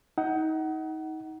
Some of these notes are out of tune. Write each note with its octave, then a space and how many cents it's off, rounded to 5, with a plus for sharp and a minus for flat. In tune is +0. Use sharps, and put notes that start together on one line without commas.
D#4 +25 F#5 +25